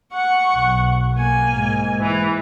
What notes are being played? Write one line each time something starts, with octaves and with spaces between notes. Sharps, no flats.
F#5 C#6
B1
A#3 G#5
G#2 G#3
E3